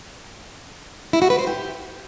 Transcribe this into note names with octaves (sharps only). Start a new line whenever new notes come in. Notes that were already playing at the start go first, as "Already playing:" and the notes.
E4
F#4
B4
C5
G4